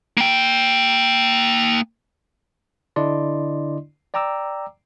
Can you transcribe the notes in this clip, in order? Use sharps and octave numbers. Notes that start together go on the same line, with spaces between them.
A#3 G5
D3 D4 E4 D5 D#5 C6
D5 G5 A#5 D6 E6